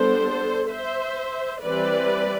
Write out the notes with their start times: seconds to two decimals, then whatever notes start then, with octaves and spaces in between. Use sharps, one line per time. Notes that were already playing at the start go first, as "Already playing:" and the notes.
Already playing: G3 B3 D4 A4 C5
0.70 C5 E5
1.63 E3 G3 C4 B4 D5